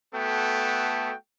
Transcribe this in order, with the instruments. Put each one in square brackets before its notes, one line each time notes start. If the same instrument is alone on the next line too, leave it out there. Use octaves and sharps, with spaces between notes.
[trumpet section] A3 B3 F#4 A4 G5